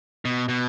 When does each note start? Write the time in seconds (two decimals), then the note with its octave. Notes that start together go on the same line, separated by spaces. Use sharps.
0.25 B2
0.48 B2